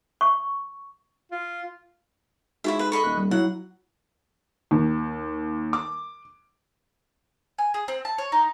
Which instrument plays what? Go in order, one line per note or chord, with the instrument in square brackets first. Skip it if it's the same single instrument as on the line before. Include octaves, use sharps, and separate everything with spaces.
[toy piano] C#6
[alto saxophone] F4
[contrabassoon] G#2 [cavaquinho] E4 C#5 E5 [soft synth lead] F#4
[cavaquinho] B4 E5
[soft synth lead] A4 [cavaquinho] D#5 B5 C#6
[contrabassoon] D#1 [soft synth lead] F#6
[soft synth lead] G3
[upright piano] F#3 [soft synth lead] E4 [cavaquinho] F#5
[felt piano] D#2
D6
[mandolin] G#5
G#4
C4
A5
C#5
D#4